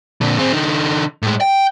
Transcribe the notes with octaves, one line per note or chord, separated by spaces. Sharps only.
A#2 D3
C4 G#4
D3 D#4
A2 G#3
G5